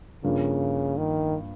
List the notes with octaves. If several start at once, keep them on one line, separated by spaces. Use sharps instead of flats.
G2 C#3 F3 A#3
D#3